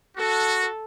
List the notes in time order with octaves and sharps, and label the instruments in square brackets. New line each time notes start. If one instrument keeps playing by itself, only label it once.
[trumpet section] F#4 [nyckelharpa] A4